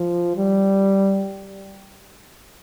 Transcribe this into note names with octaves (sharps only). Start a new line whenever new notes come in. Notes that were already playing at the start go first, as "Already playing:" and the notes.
Already playing: F3
G3